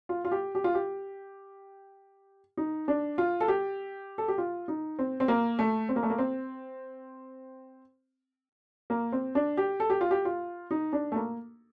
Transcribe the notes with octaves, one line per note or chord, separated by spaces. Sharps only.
F4
F4
G4
G4
F4
G4
D#4
D4
F4
A4
G4
A4
G4
F4
D#4
C4
C4
A#3
A3
C4
A#3
A3
A#3
C4
A#3
C4
D4
G4
A4
G4
F4
G4
F4
D#4
D4
A3
A#3